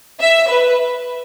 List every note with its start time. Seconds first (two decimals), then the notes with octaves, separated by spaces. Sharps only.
0.20 E5
0.49 B4